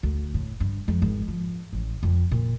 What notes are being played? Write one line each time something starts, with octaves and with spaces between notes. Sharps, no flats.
D2
A2
G2
F2
G#1
F3
A1
F2
A#2